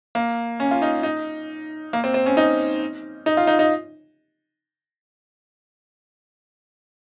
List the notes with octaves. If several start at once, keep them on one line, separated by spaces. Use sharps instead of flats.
A#3
C#4
F4
D#4
D#4
A#3
C4
C4
C#4
D#4
D#4
F4
D#4
D#4